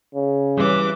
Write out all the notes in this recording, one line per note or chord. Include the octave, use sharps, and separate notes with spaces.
C#3
E3 G3 C#4 D6